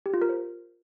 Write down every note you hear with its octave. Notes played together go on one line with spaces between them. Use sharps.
G4
F4
A#4
C5